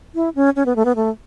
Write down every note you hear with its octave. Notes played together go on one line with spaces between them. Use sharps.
E4
C#4
C#4
B3
A3
B3
A3